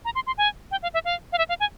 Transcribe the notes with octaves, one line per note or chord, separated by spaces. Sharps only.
A#5
C6
C6
G#5
G5
F5
E5
F5
F5
E5
F5
G#5